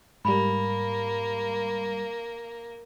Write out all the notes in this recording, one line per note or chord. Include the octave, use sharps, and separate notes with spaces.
G#2 G3 A#3 B5